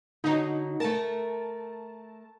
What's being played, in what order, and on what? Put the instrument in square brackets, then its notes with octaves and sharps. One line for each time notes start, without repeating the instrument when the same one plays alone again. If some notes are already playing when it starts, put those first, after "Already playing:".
[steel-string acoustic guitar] D3 F#3 [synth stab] D#4
[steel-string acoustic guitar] A3 A#4 [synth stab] A5